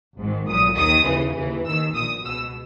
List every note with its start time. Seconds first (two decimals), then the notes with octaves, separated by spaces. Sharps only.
0.19 G#1 G#2 D#3
0.48 B1 A#2 D#6
0.77 D#2 D#3 D#6
1.06 D#2 C#3 E3
1.36 D#2 C#3 E3
1.65 D#2 D#3 E6
1.94 A#1 A#2 D#6
2.24 C#2 B2 E6